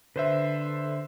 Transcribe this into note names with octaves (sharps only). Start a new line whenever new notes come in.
D3 B4 C5 E5